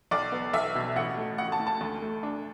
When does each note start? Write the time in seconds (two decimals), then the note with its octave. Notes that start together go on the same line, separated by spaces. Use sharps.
0.11 B1 D5
0.32 B3
0.53 B1 E5
0.75 B2
0.96 A1 F#5
1.17 A3
1.38 A1 F#5
1.52 A5
1.60 A2
1.67 A5
1.81 D2
2.02 A3
2.23 D4